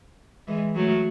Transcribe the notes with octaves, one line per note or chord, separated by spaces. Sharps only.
E3 G#3
F#3 A3